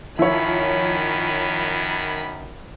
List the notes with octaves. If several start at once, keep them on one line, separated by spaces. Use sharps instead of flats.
F#2 D#3 F3 E4 C#5 B5